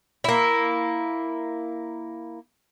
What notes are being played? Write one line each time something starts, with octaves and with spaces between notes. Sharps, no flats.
A#3 E4